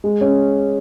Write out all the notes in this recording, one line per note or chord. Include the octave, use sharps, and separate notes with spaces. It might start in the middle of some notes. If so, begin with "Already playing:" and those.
G#3
C#4